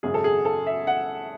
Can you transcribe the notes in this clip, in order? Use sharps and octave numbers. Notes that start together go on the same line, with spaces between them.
G#1 F#2 C#3 G#3 G#4
A4
G#4
A4
E5
F#5